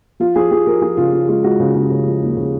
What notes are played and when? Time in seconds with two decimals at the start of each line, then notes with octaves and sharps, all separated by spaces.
0.20 F3 F4
0.36 F3 G#4
0.51 F3 G#4
0.67 F3 A#4
0.82 F3 G#4
0.97 C#3 F4
1.13 F3
1.28 G#3 F4
1.44 G#3 F#4
1.60 C#3
1.75 C#3
1.91 C#3
2.06 F3
2.22 D#2
2.37 C#3